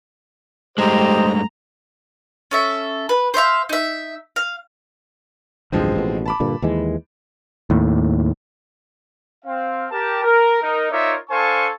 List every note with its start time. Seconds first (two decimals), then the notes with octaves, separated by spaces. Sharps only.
0.78 G2 G#3 A3 G4 C5 D#5 A#5
2.51 C#4 A4 E5
3.09 B4
3.34 C5 C#5 E5 F5
3.69 D#4 E5
4.36 F5
5.72 A1 D2 G2 F3 G#3 C4
5.95 A1 B2
6.26 A5 B5 D6
6.40 G2 A#2 D3
6.62 D#2 E3 G#3
7.70 D#2 A2
9.45 C4 F5
9.91 G4 A#4 A5
10.23 A#4
10.62 D#4 A#4
10.92 D#4 F4 A#4 C#5 D5 E5
11.30 D4 A4 C5 F5 G#5 C#6